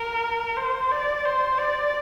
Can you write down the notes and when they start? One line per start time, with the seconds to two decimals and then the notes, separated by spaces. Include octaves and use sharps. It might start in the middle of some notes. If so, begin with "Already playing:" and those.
Already playing: A#4
0.57 C5
0.91 D5
1.25 C5
1.58 D5